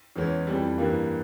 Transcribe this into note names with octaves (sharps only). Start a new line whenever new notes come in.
E2 E3 G#3 C#4
F2 E3 G3
G2 E3 G3 A#3